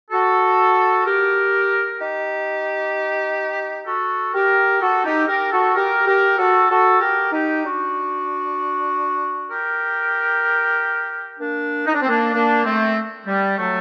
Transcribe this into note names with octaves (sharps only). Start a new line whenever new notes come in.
F#4 A4
G4 A#4
D#4 G4
F#4 A4
G4 A#4
F#4 A4
D#4 G4
G4 A#4
F#4 A4
G4 A#4
G4 A#4
F#4 A4
F#4 A4
G4 A#4
D#4 G4
D4 F#4
G4 A#4
A#3 D4
D#4
D4
C4
A#3 D4
A#3 D4
A3 C4
G3
F#3 A3